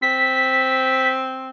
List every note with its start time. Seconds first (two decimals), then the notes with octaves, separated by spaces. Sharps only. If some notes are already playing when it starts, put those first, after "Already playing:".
0.02 C4 B6